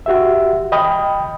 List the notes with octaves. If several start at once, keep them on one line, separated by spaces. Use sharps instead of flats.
F#4 G4 E5
D#5 G5 B5 D#6